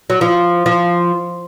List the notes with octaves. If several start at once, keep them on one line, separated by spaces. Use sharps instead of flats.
F#3
F3
F3